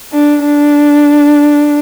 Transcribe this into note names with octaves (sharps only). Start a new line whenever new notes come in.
D4
D4